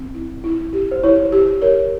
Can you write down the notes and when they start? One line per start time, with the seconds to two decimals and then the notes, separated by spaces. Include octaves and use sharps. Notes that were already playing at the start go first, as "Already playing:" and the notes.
Already playing: C4
0.14 E4
0.44 E4
0.73 G4
0.91 C5
1.04 E4 C#5
1.32 G4
1.62 A#4 C#5